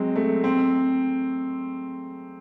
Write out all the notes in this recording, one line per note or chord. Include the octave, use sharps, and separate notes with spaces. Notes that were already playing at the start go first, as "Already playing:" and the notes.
Already playing: F#3 G#3 C4
A3
C4